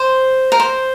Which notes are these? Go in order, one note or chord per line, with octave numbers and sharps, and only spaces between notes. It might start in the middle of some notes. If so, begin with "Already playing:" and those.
Already playing: C5
A#4
C5